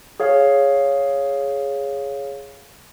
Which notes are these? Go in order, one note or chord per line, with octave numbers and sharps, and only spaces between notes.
G#4 C#5 F5